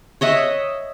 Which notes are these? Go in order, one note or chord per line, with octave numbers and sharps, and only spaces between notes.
C#5 D#5 E5 F#5